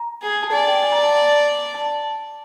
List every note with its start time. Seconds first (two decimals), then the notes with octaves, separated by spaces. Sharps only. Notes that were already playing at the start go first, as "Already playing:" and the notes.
Already playing: A#5
0.22 G#4
0.43 A5
0.52 D5 G#5
0.67 G5
0.83 G#5
0.92 A#5
0.98 A5
1.74 A5